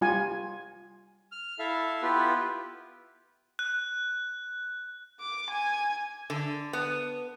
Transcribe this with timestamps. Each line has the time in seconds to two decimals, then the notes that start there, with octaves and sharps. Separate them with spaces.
0.01 G3 F4 G#5
1.32 F6
1.59 E4 A4 E5 F5
2.02 B3 E4 F4 G4 B4
3.59 F#6
5.20 D6
5.50 G#5
6.30 D3
6.73 B3